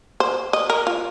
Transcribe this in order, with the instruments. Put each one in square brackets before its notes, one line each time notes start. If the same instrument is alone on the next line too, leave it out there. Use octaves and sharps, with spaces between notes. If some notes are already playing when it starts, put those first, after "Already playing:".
[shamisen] C5
D#5
A#4
F4